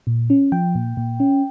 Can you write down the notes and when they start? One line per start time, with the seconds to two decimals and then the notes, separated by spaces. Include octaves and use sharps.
0.07 A#2
0.30 C#4
0.52 F3 G5
0.75 A#2
0.97 A#2
1.20 C#4